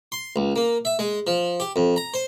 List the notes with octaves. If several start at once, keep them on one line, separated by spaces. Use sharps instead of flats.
C6
C#2
A#3
E5
G#3
F3
G4
F2
A#5
C5